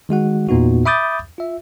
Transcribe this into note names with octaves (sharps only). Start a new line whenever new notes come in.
D#3 G#3 F#4 F#5
E2 A#2 B3 D#4 F#4
E5 B5 D6 D#6 G6 A6
F4 E5